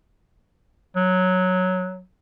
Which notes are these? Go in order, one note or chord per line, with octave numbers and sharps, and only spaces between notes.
F#3